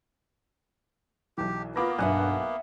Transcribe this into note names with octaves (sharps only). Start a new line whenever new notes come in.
B1 E3 G4
A#3 B3 F4 B4 D6 A#6
B1 G2 E5 F#5 G#5 F#6